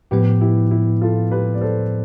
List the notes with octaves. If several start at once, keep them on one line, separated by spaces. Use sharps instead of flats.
A2 F3 B3 G4 B4
E4 G4
E4
F4 A4
G4 B4
D5
A4 C5